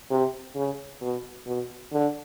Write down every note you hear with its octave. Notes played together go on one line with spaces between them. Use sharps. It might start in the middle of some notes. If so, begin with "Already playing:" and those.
C3
C#3
B2
B2
D3